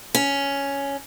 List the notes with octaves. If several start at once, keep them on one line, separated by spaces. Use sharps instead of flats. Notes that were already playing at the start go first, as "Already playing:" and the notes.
C#4